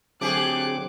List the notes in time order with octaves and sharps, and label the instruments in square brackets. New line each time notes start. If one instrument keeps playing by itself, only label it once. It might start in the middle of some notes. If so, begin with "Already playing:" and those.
[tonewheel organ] D3 F#3 C4 [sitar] A3 G4 G#4 [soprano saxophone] D6 [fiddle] F#6